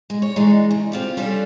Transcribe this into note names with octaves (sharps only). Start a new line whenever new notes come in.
G#3
C#5
E3 G#3 D4 D#4
C#3
C4 F4 G4
G3 C#4 D4 F4 A4